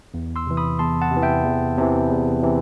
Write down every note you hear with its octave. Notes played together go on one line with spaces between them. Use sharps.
E2
C6 E6
C3 E3
B5 D#6
E2 A5 C6
F#5 A5
C3
E3
E5 G5
E2
C3 E3
E2
C3 E3